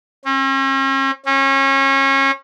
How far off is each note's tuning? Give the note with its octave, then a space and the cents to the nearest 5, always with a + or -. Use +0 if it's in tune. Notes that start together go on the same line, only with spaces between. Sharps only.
C#4 -45
C#4 -30